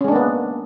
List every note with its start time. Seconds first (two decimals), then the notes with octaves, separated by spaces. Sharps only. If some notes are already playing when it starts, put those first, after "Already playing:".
0.01 C#4
0.04 G#3
0.08 D4
0.12 A#3
0.16 B3